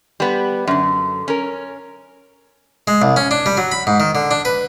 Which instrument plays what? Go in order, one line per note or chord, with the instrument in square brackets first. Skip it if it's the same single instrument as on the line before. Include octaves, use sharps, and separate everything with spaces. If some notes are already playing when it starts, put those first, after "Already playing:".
[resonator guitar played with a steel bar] G3 B3
F#2 D3
C#4 A#4
[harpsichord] G#3
C2
C#4
D4
G3
F#3
B5
G#2
D#3
D3
D4
B4